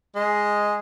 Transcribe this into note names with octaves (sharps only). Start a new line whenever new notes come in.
G#3